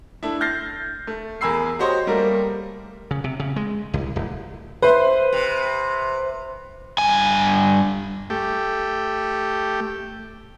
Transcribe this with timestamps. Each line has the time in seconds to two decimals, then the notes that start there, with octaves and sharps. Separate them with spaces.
0.23 A3 D4 E4
0.41 F6 G6 A6 A#6 C7
1.07 A3
1.41 E2 A#4 G#5 B5 E6 C7
1.79 F#4 G4 C5 C#5 D#5
2.07 G3 A3 A#3 A#4
3.11 C#3
3.24 C3
3.40 C#3
3.56 G#3
3.94 C2
4.16 D1
4.82 B4 C5 E5
5.33 C3
6.98 G2 G#5
8.30 A3 G4